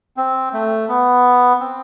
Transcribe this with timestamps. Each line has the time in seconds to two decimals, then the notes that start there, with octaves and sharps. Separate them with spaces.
0.17 C4
0.53 A3
0.89 B3
1.60 C4